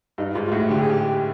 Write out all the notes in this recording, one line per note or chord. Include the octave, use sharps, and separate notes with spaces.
G2 D#4
G#2 F4
F4
A2 F#4
D3 G4
G#4
G4